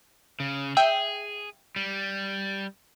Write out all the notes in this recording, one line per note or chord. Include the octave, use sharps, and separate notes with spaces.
C#3
G#4 E5 G5
G3